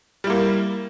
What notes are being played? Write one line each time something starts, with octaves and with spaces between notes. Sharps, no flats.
G3 A#3 E4